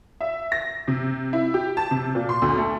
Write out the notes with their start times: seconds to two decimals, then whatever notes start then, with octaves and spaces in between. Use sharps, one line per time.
0.21 E5
0.52 A#6
0.88 C3
1.33 E4
1.54 G4
1.77 A5
1.91 C3
2.15 A#2
2.29 C6
2.42 D2
2.58 A3